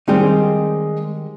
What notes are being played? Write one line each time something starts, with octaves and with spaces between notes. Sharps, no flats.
D#3 G3 G#3 C4 D#4